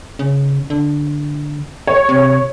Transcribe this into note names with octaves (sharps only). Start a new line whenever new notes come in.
C#3
D3
C#5
C3